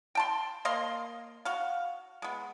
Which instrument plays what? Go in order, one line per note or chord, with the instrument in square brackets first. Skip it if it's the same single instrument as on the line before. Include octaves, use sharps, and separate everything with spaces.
[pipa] G5 A5 C6
A#3 D#5 F5 C6
F#4 F5
G#3 B3